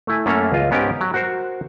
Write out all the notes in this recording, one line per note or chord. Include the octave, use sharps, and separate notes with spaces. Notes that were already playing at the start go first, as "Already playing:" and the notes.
A3 E4 G#5
F#2 A3 A#3 C#4 A4 A#5
C#2 F4 D#5
G#2 B3 C#4 G4 A#4 G5
F#3
F#4 A#4 C5